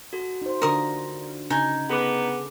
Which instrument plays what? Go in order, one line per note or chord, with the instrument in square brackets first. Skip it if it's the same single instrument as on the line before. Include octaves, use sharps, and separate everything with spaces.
[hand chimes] F#4 A4
[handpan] D#4 C5
[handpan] D3 D4 F4 [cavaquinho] A#4 D#6
[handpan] C#3 [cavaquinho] D#4 G#5
[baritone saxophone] B3 [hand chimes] G#4 A4 D6